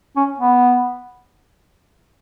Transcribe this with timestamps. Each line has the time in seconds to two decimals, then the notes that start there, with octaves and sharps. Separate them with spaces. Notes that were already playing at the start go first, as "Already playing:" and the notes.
0.16 C#4
0.40 B3